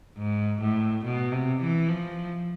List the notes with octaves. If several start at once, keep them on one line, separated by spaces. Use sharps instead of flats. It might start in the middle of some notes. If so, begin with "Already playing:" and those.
G#2
A2
B2
C3
E3
F3